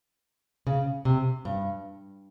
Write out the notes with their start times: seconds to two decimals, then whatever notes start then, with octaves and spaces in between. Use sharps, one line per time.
0.67 C#3
1.05 C3
1.45 G2